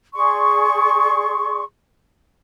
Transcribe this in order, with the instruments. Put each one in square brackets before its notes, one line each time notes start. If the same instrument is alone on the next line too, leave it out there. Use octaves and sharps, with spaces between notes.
[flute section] G#4 D5 C6 C#6